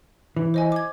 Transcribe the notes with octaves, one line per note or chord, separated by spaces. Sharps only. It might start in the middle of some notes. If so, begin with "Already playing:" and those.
E3
C5 D#5 G#5
D6 G#6